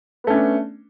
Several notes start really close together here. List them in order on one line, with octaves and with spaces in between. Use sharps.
B3 A3 C#4 D4